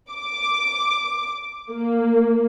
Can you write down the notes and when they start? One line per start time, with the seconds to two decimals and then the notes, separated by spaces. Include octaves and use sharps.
0.10 D6
1.71 A#3